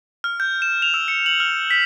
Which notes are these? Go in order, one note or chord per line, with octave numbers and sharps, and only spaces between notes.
F6
G6
E7
F7
E6
C#7
F#7
F6
B6